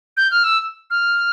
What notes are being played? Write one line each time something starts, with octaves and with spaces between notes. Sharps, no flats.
G6
F6
E6
F6